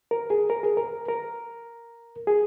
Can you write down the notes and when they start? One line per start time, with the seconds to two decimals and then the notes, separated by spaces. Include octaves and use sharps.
0.11 A#4
0.30 G#4
0.50 A#4
0.63 G#4
0.77 A#4
1.08 A#4
2.27 G#4